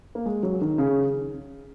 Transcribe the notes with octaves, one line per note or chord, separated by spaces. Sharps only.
A#3
G#3
F#3
D#3
C#3